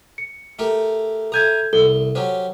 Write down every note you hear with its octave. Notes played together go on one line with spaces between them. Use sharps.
C#7
A3 G4 A#4
A4 E5 G#5 A#5 G6 G#6
C2 A4 G7
F#3 C#4 G4 C5